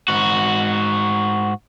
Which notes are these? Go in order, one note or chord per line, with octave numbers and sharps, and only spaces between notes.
G#2 F#4